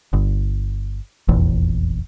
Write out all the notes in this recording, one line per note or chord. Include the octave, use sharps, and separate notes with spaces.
G1
F1 A#1 E2